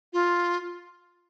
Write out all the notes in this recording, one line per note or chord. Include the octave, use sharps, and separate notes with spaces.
F4